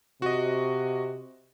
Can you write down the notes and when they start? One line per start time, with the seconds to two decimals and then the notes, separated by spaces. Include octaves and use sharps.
0.22 C3 F#4 D#5